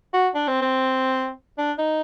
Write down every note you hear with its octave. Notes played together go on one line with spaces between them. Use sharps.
F#4
D4
C4
C4
D4
D#4